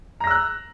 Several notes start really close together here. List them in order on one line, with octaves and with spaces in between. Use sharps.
A#5 A#6 E6 F#6